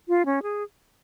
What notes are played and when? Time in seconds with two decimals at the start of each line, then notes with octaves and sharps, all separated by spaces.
0.08 F4
0.26 C#4
0.43 G#4